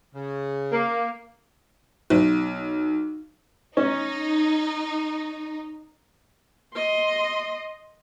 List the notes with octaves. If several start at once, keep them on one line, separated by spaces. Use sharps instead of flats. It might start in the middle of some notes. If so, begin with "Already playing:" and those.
C#3
A#3
B1
C#4 D#4
D#5 C6